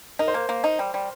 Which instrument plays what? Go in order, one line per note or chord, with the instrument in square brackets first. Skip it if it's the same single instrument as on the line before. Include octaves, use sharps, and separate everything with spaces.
[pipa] D#4 [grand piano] A#4
[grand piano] C5
[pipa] A#3 [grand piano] A#4
[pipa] A#3
D#4
G3
G3